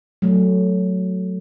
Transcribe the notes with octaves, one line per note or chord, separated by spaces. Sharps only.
F#3 A3